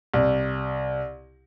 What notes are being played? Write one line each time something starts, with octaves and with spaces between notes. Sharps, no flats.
C2